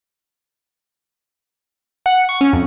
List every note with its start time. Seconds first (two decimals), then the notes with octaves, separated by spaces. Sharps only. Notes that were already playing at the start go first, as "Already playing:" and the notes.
2.06 F#5
2.29 C#6
2.41 C#4
2.53 F2